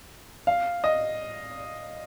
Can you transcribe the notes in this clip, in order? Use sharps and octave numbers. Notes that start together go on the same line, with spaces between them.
F5
D#5